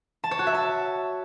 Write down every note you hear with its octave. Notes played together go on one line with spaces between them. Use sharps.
A5
C#5
F#4
E5
A5